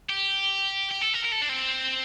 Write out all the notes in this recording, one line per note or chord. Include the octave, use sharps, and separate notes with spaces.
G4
G4
A4
A#4
A#4
A4
D4
C4